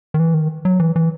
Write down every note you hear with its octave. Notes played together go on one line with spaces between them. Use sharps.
D#3
E3
D#3
F#3
E3
E3